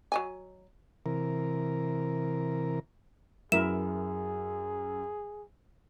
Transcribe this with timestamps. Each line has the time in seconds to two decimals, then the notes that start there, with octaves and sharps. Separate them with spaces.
0.12 F#3 D#5 G#5
1.06 C3 E3 A#4
3.52 F#2 E4 G#4 A#4 E5 E7